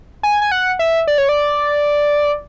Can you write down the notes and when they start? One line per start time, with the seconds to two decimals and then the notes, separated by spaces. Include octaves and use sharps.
0.23 G#5
0.42 G#5
0.51 F#5
0.79 E5
1.07 D5
1.18 C#5
1.29 D5